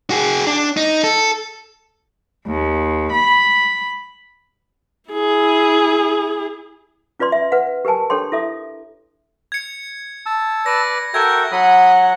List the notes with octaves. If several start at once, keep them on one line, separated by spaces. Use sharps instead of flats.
F#4 G#4
D4
D#4
A4
D#2
B5
E4 G#4
C#4 F4 B4 D5 C6
E5
B4 F#5
G4 A#4 B4 G#5 A5
D4 G4 A4 C#5 G5 C6
E4 A4 E5 D#6
G#6 C#7
A5 E6
B4 D5 A#6
F#4 A4 A#4 E5 G5 G#6
F#3 F#5 B5 D#6